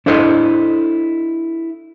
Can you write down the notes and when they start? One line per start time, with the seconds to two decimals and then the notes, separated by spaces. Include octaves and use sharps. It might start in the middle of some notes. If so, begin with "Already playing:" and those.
0.06 D4 E4 A4 C5 D#5